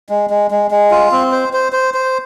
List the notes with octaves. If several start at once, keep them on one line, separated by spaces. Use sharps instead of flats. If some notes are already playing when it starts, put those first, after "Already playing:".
G#3
G#3
G#3
G#3
F4
C4
C5
C5
C5
C5